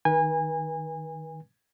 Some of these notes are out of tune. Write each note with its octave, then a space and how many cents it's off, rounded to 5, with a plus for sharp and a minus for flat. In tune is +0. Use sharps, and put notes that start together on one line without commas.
D#3 +0 B4 -40 G#5 -25